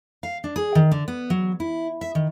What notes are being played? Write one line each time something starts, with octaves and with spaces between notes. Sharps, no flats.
F5
D4
G#4
D#3
D3
B3
F#3
E4
E5
D#3